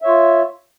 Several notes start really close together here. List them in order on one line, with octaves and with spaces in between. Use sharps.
E5 C#5 F4